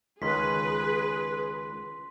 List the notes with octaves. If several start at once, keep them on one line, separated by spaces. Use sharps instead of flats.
C#2 D#3 C#4 G#4 B4 C6 B6